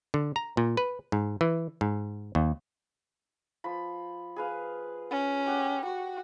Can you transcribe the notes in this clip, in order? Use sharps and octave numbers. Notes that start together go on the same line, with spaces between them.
D3
A#5
A#2
B4
G#2
E3
G#2
D#2
F3 B5
G#4 B4 F5
C#4
G4 F#5
F#4 C#6